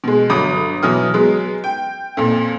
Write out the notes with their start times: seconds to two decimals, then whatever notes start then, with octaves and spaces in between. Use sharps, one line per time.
0.04 B2 G#3
0.30 G1 F#3 B5 D6 D#6
0.83 B2 E3 F#3 B3 D#6 F6
1.14 F#3 G#3 B3
1.64 G5
2.17 F2 A#2